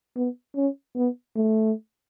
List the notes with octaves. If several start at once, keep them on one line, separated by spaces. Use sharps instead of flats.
B3
C#4
B3
A3